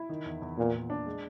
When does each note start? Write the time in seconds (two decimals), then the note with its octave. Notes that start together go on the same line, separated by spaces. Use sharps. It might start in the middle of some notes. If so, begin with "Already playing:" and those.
Already playing: E4
0.09 D#3
0.26 E2
0.42 E2
0.58 A#2 B3
0.74 A#2
0.90 D4
1.06 G#3